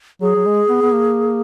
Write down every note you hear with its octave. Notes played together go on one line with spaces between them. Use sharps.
F#3 G#4
F#3
G#3
B3
B3
A#3